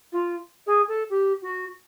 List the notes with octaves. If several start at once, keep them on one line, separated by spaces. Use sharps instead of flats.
F4
G#4
A4
G4
F#4